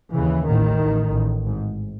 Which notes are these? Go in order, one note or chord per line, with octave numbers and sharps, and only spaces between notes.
D#2 C#3 E3
A1 A2 D#3
A1 A2
A1 A2
G#1 G#2